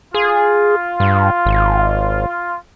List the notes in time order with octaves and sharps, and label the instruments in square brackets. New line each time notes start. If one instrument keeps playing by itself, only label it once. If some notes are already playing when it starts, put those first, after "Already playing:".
[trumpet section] F4 [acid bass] G#4
[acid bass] G2
G#1